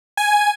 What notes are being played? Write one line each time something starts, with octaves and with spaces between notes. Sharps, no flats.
G#5